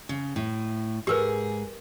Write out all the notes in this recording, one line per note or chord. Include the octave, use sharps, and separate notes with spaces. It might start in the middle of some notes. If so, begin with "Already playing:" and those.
C#3
A2
G#2 G4 G#4 A#4 B4